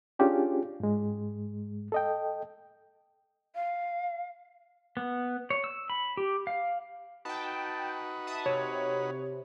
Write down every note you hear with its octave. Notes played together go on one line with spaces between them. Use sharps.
C#4 D4 F4 G4 G#4
G#2 G#3
A4 D#5 G5
F5
B3
C#5
E6
B5
G4
F5
D#4 F#4 B4 G5 A5
E5 A5 D#6
C3 C#5